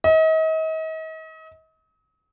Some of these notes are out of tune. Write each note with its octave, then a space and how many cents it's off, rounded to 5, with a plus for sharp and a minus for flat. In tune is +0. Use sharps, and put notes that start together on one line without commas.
D#5 +40